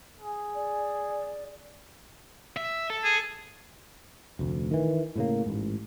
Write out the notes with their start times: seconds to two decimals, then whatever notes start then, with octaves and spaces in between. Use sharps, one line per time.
0.19 G#4
0.55 D5
2.57 E5
2.90 A4
3.04 G#4
4.39 F1 D2
4.71 D#3 E3
5.16 A2 C#3 A#3
5.46 A1 G#2